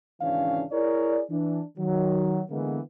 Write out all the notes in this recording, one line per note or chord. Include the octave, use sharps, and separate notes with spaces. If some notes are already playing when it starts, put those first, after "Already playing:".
G#1 C#3 E3 C#4 D4 F5
E4 G#4 A#4 C#5 D5
E3 D4
D#3 F#3
D3 E3 G#3 A#3 B3